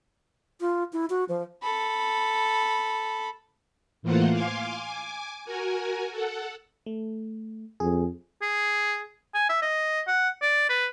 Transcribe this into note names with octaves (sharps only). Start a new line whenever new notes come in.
F4
E4
F#4
F3
A4 B5
A2 E3 A#3 F4 C5 F#5
F5 G#5 C6 D6
G#5 D6
F#4 A#4 G#5
A4 F#5
A3
F2 G#4
G#4
G#5
E5
D#5
F#5
D5
B4